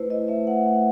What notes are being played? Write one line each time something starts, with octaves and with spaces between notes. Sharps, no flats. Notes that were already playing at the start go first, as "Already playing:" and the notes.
Already playing: A3 E4 B4 C5
E4 D#5
A3 E5
A3 F#5
A3